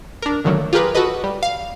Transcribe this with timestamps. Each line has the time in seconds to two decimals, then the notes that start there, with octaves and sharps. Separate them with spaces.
0.22 D4 A#4
0.44 A#2 D3 D#3 F#3 A3 A#3
0.73 F4 G4 G#4 A#4 B4
0.95 F#4 A4 B4 D#5
1.24 G3
1.43 F5